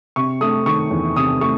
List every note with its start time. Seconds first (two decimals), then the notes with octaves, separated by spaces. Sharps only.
0.16 C3 C#6
0.41 A3 D#6
0.66 D#3 C#6
0.91 E2
1.16 C3 D#6
1.41 A3 C#6